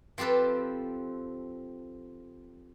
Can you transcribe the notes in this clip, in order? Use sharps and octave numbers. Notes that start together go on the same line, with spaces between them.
F3 C4 G4 A4 B4